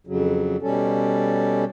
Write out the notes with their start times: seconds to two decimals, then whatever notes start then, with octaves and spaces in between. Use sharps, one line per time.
0.07 F2 C#3 F#3
0.62 B2 G3 C#4 A4